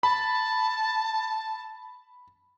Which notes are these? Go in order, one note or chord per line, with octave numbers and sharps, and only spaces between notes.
A5 B5